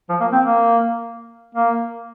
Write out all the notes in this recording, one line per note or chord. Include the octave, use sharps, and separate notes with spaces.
F3
A#3
C4
A#3
A#3